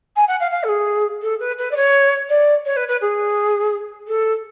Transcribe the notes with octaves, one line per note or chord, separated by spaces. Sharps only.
G#5
F#5
F5
F5
A4
G#4
A4
B4
B4
D5
C#5
D5
C#5
B4
B4
G#4
A4